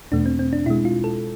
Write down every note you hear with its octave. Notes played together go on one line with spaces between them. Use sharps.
E2 B2 A3 D4
C4
C4
D4
B2 G#3 E4
F4
A4